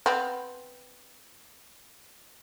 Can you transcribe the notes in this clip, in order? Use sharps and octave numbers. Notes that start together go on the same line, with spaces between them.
B3 C4